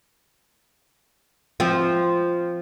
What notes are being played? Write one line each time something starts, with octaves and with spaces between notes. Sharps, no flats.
F3 C4